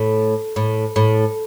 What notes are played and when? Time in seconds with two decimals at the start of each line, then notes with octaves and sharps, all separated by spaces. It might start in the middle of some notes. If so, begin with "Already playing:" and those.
Already playing: A2
0.56 A2
0.96 A2